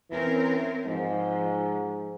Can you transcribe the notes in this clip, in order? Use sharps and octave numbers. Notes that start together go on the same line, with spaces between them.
E3 C4 C#4 A#4
G#2 F3